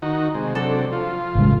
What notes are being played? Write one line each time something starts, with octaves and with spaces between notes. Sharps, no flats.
D#3 D#4 F#4
C3 G#3
C3 F#3 D4 A4
F3 F4
A1 C#3 G#3